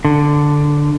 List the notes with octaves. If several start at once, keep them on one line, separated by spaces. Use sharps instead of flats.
D3